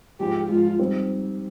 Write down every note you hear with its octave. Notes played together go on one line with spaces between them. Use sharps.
G#2 F3 G#3 G4
G#2 F3 G#3 F4
G3 C4 D#4